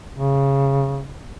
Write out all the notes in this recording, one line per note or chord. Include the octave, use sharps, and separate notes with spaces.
C#3